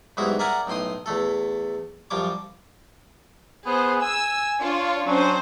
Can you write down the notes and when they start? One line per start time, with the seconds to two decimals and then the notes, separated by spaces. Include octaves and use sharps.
0.17 B1 G#2 G3 G#3 E4 F#4
0.39 A#4 D5 E5 F#5 G#5 A#5
0.67 B1 A2 G5 C6 D#6
1.06 E2 A3 A4
2.11 F#2 F3 G3 C#5 D6
3.66 B3 G#4 C5
4.02 G#5 E6
4.60 D4 F4 C#5
5.06 F#3 C#4 D4 C5